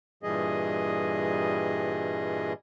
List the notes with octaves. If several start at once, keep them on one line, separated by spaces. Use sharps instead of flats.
G2 A#2 E3 G3 G#4 D#5